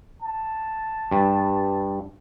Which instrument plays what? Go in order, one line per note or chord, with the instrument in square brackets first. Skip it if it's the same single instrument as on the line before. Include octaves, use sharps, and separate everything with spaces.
[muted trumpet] A5
[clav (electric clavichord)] G2